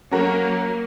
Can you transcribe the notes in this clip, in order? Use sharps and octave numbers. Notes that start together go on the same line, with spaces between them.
F#3 A#3 C#4 F#4 A#4